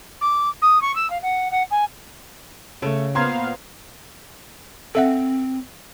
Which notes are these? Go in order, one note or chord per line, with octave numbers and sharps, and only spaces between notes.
D6
D#6
C#6
E6
F5
F#5
F#5
G#5
C#3 A3 A4
A#2 B3 C5 F5 A#5 C6 G#6
C4 A4 E5 F#5